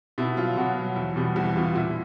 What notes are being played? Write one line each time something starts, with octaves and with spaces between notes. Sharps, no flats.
B2 E4
F#3 F4
B2 F#4
F#3
E2
B2 G3
E2 F#4
B2 G3 F4
A#2 E4